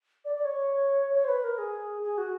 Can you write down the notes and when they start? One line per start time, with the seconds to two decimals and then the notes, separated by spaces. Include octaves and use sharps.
0.25 D5
0.35 D5
0.45 C#5
1.14 C#5
1.24 C5
1.28 B4
1.44 A#4
1.58 G#4
2.02 G#4
2.18 F#4